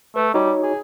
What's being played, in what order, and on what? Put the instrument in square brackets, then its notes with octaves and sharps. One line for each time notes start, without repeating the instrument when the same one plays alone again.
[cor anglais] A3 [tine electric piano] B4
[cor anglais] G3 [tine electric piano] D#4 F#4 C#5
[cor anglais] G#4